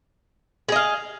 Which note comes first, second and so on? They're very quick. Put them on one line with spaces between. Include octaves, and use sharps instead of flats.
G#4 D#5 F5